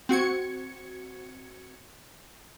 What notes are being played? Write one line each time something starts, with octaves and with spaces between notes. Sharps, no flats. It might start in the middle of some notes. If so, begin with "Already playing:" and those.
C4 F#4 G#6 C#7